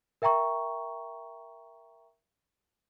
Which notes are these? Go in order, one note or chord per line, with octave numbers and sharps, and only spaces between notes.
A#4 E5 G5 A#5 C#6